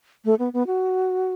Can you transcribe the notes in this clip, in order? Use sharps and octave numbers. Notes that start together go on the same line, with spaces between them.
A3
B3
B3
F#4